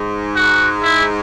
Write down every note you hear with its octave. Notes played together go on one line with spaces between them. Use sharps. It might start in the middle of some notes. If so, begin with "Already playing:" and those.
Already playing: G#2
F#4
E4